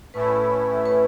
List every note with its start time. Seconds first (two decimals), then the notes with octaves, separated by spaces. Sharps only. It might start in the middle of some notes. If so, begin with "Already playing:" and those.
0.14 A2 A3 C#4 E4 B4
0.86 B4